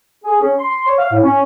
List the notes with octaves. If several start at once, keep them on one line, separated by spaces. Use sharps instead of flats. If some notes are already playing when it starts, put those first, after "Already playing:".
G#4
C#4
C6
C#5
F5
A2
C#4